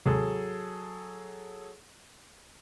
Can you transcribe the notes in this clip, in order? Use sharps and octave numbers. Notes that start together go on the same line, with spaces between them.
D#2 G#2 C3 F#3 G#4 A4